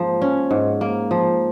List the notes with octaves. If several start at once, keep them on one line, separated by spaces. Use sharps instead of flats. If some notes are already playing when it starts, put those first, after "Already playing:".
Already playing: G#2 F3 A#3
C#4
G#2
A#3
F3